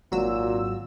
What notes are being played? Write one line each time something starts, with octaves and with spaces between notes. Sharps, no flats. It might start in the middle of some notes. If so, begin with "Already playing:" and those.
G#1 A#2 F#3 F#4 E6